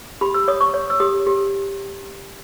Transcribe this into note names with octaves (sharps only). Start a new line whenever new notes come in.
G4 B5
E6
C#5 D#6
C#6
C#5
E6
G4 D#6
G4